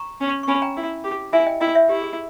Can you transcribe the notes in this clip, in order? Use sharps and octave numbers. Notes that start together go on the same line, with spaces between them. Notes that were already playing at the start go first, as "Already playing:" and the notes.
Already playing: A#5 C#6
C#4
C#6
C#4 G#5 B5
G5 A#5
E4
G4
E4 E5 G#5
D#5 G5
E4 D#5 G5
C#5 E5
E4 G4
G#4